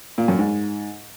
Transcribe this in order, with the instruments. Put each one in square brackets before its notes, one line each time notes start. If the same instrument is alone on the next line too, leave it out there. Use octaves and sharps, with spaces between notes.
[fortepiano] A#2
F#2
G#2